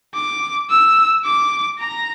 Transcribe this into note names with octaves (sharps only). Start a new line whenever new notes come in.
D6
E6
D6
A#5